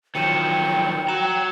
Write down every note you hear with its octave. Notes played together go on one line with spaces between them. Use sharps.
D#3 F3 F#3 G5 C#7 D#7 E7
F#4 A#5 E7